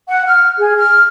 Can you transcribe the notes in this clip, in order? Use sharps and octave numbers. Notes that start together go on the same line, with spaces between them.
F#5
F6
G#4
F6